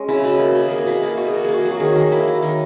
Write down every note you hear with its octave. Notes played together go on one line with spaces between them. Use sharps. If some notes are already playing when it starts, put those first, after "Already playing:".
Already playing: G#3 C#4
C#3 E4
B2
A#3
B2
A#3 G#4
F#4
B2 E4
A#3
B2 F#4
G#4
A#3 F#4
A#3 G#4
F#4
F#3 G#4
F#4
D#3 G#4
F#4
D#3
A#3 E4
F#3
D#3